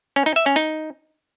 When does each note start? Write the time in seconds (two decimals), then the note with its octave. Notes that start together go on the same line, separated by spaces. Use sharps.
0.16 C#4
0.26 D#4
0.36 E5
0.46 C#4
0.56 D#4